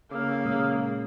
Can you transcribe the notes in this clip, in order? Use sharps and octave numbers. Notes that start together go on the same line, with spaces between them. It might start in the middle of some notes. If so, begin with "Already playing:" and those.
C#3 A#3 D6 E6 F6
A#2 G#3 D#6